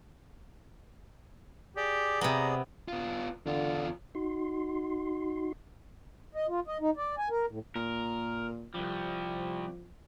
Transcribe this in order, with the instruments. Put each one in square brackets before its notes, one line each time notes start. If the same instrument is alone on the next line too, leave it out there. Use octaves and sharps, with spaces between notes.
[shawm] G4 [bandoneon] G#4 D5
[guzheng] C3 B3 [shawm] A#5
[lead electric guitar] B3 F4
[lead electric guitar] E2 F4 [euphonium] D3
[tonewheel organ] D#4 F#4 C6
[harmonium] D#5
F4
D#5
D#4
D5
G#5
A#4
A2
[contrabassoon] A#2 [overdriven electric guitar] A#4
[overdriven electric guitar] C2 G3 [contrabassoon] F3